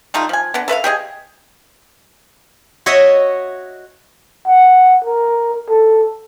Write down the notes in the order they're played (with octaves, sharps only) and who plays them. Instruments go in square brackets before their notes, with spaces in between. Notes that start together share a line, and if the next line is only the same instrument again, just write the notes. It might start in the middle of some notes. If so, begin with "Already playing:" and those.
[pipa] G3 A3 D#4 F4
F3 G#5
D3 B3
A4 B4 E5 F5
G4 G#4 D#5 G#5
[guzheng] F#4 C#5 D#5 E5
[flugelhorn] F#5
A#4
A4